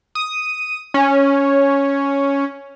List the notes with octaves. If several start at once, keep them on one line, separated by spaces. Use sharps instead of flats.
D#6
C#4